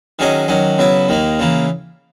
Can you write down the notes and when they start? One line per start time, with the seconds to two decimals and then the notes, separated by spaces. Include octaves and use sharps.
0.19 D#3 F#3 C#4 G#4 D#5
0.48 D#3 F#3 C#4
0.78 C#3 F#3 B3 E4
1.09 D#2 D#3 A#3
1.39 C#3 E3 A#3